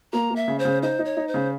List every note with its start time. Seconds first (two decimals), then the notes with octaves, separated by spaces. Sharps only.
0.13 A#3 A#5
0.30 A#3
0.36 E5
0.48 C#3
0.59 C5
0.65 C#3
0.83 D#4 C5
0.99 D#4
1.05 C#5
1.17 D#4
1.28 C5
1.34 C#3